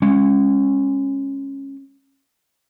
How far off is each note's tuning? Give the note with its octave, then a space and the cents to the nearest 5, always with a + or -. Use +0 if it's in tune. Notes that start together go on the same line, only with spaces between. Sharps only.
G#3 -25 C#4 -15